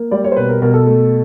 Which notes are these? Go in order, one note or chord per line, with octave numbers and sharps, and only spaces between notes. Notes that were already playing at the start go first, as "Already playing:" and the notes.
Already playing: A#3
G3 D5
C#5
C5
B2 B4
A#4
B2 A#4
A4
A3